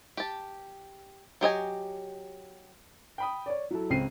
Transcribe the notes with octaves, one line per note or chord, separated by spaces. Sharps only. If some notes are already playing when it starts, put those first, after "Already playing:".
G4 A5
F#3 G4 D#5 G#5
G5 B5 D#6
C#5 D5
F#3 E4 A4
C#2 C#3 C4 C7 D#7